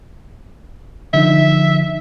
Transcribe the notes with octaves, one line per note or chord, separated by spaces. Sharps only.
D3 F3 D#4 E5